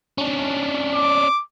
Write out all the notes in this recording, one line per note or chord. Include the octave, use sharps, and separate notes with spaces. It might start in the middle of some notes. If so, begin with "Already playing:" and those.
C#4 D4
D6